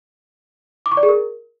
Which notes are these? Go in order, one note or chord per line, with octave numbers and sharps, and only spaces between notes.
D6
C#6
D5
G#4
A#4